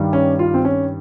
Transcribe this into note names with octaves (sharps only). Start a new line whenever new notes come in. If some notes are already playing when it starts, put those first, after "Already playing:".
Already playing: G2 D#3 G3
C#4
F4
C4
C#4